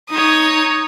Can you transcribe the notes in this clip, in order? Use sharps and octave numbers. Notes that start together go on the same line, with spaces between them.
D#4 C#5 D#6